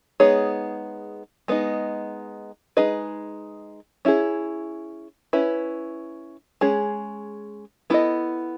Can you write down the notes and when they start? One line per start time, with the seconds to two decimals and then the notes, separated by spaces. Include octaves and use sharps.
0.20 G#3 B3 D#4 G#4 C#5
1.48 G#3 B3 D#4
2.77 G#3 D#4 G#4 B4 D#5
4.05 C#4 E4 G#4
5.33 C#4 E4 B4
6.61 G#3 C#4 G#4
7.90 B3 E4 A4 D#5